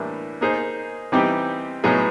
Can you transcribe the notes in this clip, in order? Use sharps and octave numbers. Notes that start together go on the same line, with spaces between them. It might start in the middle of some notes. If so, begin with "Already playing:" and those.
Already playing: A2 E3 G3 A#3 D4
A#3 D#4 G#4 C5
E3 G3 C4 D#4 G4
A2 F#3 B3 D#4 G#4